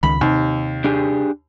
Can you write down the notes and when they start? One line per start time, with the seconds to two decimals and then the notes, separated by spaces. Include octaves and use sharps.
0.03 C#2 D#3 B5
0.21 D#2 C3
0.84 D4 G4 G#4